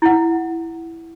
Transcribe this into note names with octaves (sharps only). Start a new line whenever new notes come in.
E4 F#5